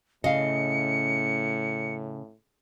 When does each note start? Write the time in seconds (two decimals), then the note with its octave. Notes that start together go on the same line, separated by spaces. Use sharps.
0.24 A2 C#3 D#5 F5 C#7